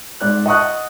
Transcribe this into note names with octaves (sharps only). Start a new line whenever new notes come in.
G#2 D5 F#6
D#5 F#5 A5 C#6 D#6 F#6